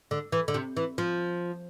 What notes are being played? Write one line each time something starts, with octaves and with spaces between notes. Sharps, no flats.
D3
E3
D3
C3
E3
F3